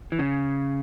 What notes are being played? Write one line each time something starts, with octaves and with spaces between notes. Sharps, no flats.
E3
C#3